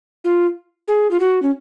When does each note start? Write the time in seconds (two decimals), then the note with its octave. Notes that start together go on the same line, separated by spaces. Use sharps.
0.24 F4
0.88 G#4
1.11 F4
1.20 F#4
1.42 C#4